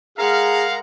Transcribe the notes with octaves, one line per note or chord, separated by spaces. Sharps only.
G#3 G#4 A#4 F5 F#5 A#5